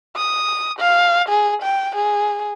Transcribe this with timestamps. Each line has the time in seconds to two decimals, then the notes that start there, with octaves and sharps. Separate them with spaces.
0.16 D#6
0.79 F5
1.29 G#4
1.62 G5
1.95 G#4